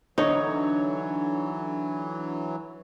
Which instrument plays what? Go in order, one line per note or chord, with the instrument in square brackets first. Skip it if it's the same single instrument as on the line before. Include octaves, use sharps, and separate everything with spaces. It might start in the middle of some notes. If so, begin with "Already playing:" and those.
[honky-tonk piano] D3 [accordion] E3 F#3 [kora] D#4 [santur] C#5